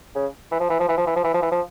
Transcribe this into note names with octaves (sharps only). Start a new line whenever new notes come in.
C#3
E3
F3
E3
F3
E3
F3
E3
F3
E3
F3
E3
F3